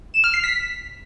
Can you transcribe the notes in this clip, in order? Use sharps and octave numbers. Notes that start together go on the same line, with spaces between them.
E7
F6
C7
B6